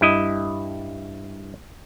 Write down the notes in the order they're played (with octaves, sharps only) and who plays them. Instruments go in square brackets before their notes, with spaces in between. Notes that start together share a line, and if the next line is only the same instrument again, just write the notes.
[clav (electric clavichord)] G2 E4 D#5